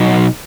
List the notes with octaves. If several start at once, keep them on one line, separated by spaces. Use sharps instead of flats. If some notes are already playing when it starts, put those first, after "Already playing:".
Already playing: B2 F#3 D#4 F#4